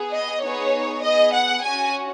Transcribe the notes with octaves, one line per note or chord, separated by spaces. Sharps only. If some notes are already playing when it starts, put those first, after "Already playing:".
Already playing: B3 G#4
D#5
B3 D#4 G#4 C#5
B3 G#4 D#5
F#5
C#4 F#4 G#5